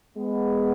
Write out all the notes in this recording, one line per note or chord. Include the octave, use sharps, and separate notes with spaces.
G#3 B3